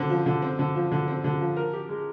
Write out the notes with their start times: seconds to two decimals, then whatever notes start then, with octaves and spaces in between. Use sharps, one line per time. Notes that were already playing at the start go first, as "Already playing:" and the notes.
Already playing: D3 C4
0.10 F3
0.26 D3
0.42 C4
0.59 D3
0.75 F3
0.92 D3
1.08 C4
1.24 D3
1.40 F3
1.57 A#4
1.73 G4
1.89 G#3